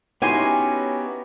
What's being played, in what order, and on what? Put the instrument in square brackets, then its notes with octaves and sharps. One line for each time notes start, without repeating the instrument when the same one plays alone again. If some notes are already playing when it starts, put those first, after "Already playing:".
[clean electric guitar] B3 G4 [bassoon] C#4 [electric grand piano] D#4 E4 F#4 [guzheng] G#5 C6